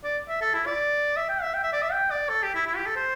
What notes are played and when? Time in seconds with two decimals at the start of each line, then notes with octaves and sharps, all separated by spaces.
0.04 D5
0.29 E5
0.41 A4
0.54 E4
0.66 D5
1.17 E5
1.29 G5
1.42 E5
1.54 G5
1.63 E5
1.73 D5
1.82 E5
1.92 G5
2.11 D5
2.29 A4
2.43 G4
2.55 E4
2.67 E4
2.76 G4
2.86 A4
2.96 C5